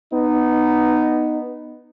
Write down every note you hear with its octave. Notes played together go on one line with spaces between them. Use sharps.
B3 D#4